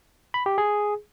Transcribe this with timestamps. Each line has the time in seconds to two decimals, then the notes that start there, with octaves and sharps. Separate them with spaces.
0.34 B5
0.46 G4
0.58 G#4